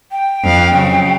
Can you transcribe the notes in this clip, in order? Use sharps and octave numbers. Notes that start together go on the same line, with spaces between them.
G5
F2 F5
C#3 F#3